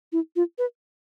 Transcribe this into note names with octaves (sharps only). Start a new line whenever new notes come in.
E4
F4
B4